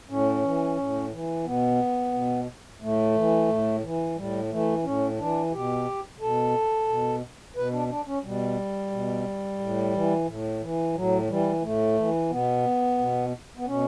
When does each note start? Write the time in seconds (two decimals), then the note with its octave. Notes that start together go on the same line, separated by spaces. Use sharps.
0.09 A2 C#4
0.43 E3
0.78 A2
1.12 E3
1.45 B2 B3
2.13 B2
2.81 A2 A3
3.16 E3
3.48 A2
3.83 E3
4.16 A2 G3
4.51 E3 A3
4.84 A2 C#4
5.19 E3 D4
5.53 B2 G4
6.20 B2 A4
6.88 B2
7.56 B2 B4
7.73 D4
7.90 D4
8.07 C#4
8.24 B2 G3
8.91 B2
9.59 A2
9.93 E3
10.28 A2
10.62 E3
10.95 A2 F#3
11.28 E3 G3
11.62 A2 A3
11.97 E3
12.30 B2 B3
12.99 B2
13.57 B3
13.67 B2 C#4